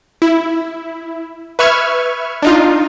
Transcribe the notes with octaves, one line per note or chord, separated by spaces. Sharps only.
E4
B4 E5 C#6 F6 G#6
D4 D#4 F4